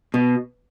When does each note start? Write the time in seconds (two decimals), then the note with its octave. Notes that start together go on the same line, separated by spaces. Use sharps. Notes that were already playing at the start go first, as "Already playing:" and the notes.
0.14 B2